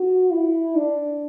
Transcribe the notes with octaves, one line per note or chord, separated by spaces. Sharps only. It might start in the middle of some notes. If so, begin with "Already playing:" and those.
Already playing: F#4
E4
D4